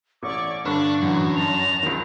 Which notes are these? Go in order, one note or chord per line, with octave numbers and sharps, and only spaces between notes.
A1 C#5 D5 C#6 D6
G2 D3 D4 C#6 F#6
F#2 A2 E3 F#3
A5 A#6 F7
C#2 D#3